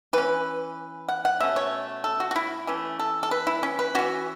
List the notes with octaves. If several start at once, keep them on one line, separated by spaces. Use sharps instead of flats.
E3 C#4 B4
F#5
F#5
B2 A3 C#4 E5
C#5
A4
F#4
F#4
E4
E3 A3 C#4
A4
A4
B4
E4
C#4
B4
E3 C#4 F#4